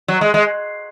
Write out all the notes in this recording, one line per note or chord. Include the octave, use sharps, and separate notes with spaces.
F#3
G#3
G#3